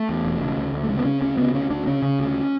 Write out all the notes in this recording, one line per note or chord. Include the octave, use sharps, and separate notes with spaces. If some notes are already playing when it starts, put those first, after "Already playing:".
Already playing: A3
E2
E1
C#3
D2
D2
A3
C#3 G#3
B3
C#3 C#4
D2 C#4
C#3 B3
D2 C#4
D2 D4
C#3 C#4
C#3
D2